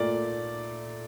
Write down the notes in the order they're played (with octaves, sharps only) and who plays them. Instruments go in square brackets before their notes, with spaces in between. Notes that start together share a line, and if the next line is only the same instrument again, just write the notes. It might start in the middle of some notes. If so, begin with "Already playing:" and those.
Already playing: [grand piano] A#2 A3 D5